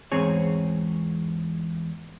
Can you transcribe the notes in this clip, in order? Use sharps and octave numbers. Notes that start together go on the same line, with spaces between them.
E2 G#2 C4 G#4 C#5